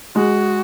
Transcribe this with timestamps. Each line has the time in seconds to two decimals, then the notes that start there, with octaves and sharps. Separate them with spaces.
0.16 G#3 F#4